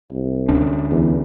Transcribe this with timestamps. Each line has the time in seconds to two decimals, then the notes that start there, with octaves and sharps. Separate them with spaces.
0.11 C2
0.48 D2 C#4 D4
0.91 E2